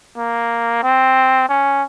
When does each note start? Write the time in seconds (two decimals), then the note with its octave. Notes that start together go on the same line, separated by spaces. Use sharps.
0.17 A#3
0.83 C4
1.49 C#4